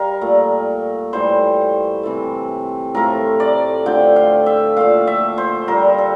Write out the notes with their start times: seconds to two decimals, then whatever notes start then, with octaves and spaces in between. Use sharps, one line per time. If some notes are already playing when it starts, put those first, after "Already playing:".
Already playing: G3 A#4 F5
0.21 A#2 A3
1.13 A2 E3 G3 C5
2.03 C3 E3 A3
2.95 A2 F3 A3 A#4
3.40 D5
3.86 D3 F3 A3 G5
4.16 F5
4.46 E5
4.77 A#2 F3 A3 F5
5.07 E5
5.38 C5
5.68 A#2 G3 A#4
5.98 A4